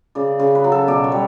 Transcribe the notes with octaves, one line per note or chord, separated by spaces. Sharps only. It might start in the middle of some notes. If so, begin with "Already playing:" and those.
C#3 D5
C#3 C#5
B4
F#3
A4
B2 D5
C#5
G3